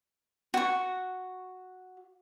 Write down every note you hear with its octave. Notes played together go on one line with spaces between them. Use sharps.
F#4 C#6